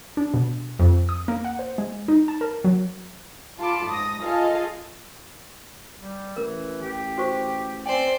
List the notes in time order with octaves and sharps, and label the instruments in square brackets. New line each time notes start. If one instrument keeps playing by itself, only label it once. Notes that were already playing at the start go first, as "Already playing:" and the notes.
[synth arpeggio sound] D4
B2
F2
D#6
A#3
F#5
C5
G#3
D#4
A5
A#4
F#3
[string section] F4 A4 A5 B5 C6 D6
G#2 D#6 A#6
F4 G#4 A4 D#5 F5
[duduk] G3
[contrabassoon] A1 [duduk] E3 [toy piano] A#4
[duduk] G4
[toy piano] F#4 C5 C#6
[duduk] C4 [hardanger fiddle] C5 D5 [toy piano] G5 G#5